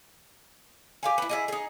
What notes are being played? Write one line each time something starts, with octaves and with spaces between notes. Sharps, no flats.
G4 F5 G#5
E4 B4
E4 G#4 D#5
D#4 G#4